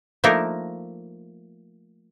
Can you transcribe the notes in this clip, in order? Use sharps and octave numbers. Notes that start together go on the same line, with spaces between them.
F3 A3 A#3 D4 D#4 A#4